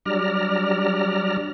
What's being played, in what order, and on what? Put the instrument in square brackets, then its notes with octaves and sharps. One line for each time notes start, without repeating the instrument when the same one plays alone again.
[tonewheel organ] F#3 G3 D4 D5 A#5 F6